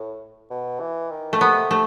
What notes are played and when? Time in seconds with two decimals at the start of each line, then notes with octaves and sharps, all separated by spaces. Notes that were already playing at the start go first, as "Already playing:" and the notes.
Already playing: A2
0.50 B2
0.80 E3
1.10 D#3
1.33 A3
1.41 C3 B3
1.71 C3 A3